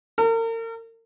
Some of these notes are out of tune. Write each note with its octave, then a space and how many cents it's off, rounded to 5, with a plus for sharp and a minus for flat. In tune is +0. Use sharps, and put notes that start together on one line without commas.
A#4 -40